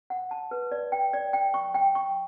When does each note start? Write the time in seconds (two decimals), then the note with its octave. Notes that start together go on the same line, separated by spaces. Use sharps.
0.10 F#5
0.31 A5
0.51 B4
0.72 D5
0.92 G5
1.13 D5
1.33 G5
1.54 C#6
1.74 G5
1.95 C#6